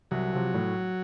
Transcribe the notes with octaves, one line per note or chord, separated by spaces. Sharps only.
C2 F#3
C3 F3
A2